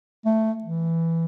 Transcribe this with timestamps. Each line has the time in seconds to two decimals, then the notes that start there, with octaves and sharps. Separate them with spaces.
0.26 A3
0.64 E3